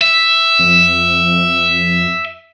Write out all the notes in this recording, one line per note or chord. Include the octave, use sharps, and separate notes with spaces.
E5
F2